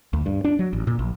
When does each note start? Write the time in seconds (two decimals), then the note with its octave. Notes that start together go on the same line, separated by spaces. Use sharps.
0.13 D2
0.26 G2
0.44 D4
0.59 F#3
0.73 A1
0.87 A#2
0.99 A#1